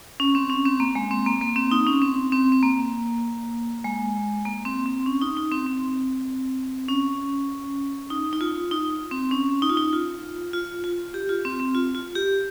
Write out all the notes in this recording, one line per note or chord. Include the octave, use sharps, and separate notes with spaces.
C#4
C4
C#4
C4
A#3
G#3
C4
A#3
A#3
C4
D#4
C#4
C4
C4
C4
A#3
G#3
A#3
C4
C4
C#4
D#4
D#4
C4
C4
C#4
D#4
D#4
F4
D#4
C4
C#4
D#4
F4
D#4
F4
F4
F4
G4
F4
C4
C4
F4
F4
G4